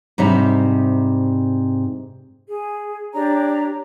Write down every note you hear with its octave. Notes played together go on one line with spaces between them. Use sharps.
G#2 C3 G3 D#4
G#4
D4 G4 C#5 A#5